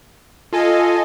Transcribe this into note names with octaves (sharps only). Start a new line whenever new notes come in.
F4 A4 D#5 G#5